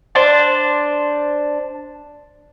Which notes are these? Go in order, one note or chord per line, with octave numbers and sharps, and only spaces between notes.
D4 C5 A5